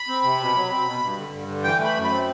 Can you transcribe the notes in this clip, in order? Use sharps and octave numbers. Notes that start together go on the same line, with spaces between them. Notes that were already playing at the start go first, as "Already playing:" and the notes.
Already playing: B5
C4
C3
B2
F#3
C4
B2
G2
D3
G2
D3
E3 G5
A3 B5
F#2
B5
C4